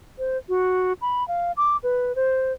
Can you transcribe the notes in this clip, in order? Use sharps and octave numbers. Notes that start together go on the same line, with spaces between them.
C5
F#4
B5
F5
D6
B4
C5